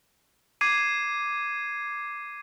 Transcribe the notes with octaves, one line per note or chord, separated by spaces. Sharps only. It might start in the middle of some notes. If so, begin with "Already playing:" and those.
D6 G#6 C7 D#7